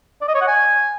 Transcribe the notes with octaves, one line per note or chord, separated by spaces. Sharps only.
D5
D#5
C#5
F#5
G#5